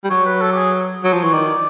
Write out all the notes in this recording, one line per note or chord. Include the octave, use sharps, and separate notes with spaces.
G3
F#3 C#5
B4
A4
G4
G#4
F#3
F3
E3 C#5
D#3 D5